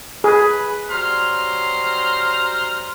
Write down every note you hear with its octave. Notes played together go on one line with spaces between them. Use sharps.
G#4 B4
F#3 G3 C5 A#5 C6 F6